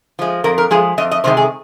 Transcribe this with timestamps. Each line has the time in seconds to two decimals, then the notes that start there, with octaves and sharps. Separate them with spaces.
0.19 F3 G#3
0.44 F2 A#4
0.58 A#4
0.71 F3 G#3 G#4
0.98 F2 D#5
1.11 D#5
1.24 C3 D#3 G#3 C5
1.37 G#4